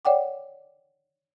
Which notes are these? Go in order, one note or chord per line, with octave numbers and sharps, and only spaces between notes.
C#5 D5 F#5 G5 D6